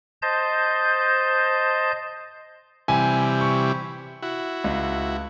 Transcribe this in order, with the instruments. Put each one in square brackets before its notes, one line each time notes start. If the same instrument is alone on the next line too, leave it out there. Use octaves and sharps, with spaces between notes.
[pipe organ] C5 D#5 A5 G6
[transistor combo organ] C3 E3 G3 [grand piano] G#5
[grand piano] C#6
[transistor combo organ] E4 F#4
[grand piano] C#2